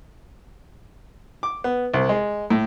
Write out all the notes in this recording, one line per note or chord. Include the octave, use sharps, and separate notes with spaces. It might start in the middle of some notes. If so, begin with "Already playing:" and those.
D6
B3
C2
G#3
A2